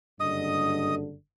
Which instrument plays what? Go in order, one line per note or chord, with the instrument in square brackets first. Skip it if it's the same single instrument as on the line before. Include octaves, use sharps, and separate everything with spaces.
[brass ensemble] F#1 G2 D3 [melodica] D#5 D#6